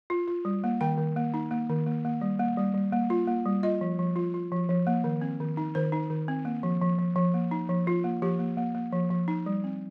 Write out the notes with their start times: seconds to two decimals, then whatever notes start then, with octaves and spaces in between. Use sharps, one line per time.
0.10 F4
0.28 F4
0.45 G3
0.64 A#3
0.81 D#3 G5
0.98 D#3
1.16 A#3
1.34 D#4
1.51 A#3
1.69 D#3
1.86 A#3
2.05 A#3
2.22 G3
2.39 A#3
2.57 G3
2.74 G3
2.93 A#3
3.10 F4
3.27 A#3
3.46 G3
3.63 F4 D#5
3.81 F3
3.99 F3
4.16 F4
4.34 F4
4.52 F3
4.69 F3
4.87 A#3
5.04 D#3
5.21 C4
5.40 D#3
5.57 D#4
5.75 D#3 C5
5.92 D#4
6.10 D#3
6.28 C4
6.45 A#3
6.63 F3
6.82 F3
6.99 F3
7.16 F3
7.34 A#3
7.51 D#4
7.69 F3
7.87 F3 F4
8.04 A#3
8.22 F3 G4
8.39 A#3
8.57 A#3
8.75 A#3
8.92 F3
9.11 F3
9.28 D#4
9.46 G3
9.64 C4